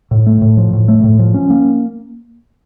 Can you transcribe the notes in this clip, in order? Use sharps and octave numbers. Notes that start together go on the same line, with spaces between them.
A2
A3
A2
F3
A2
A3
A2
F3
C#4
A#3